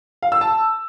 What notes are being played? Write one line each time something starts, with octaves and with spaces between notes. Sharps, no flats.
F5
E6
A5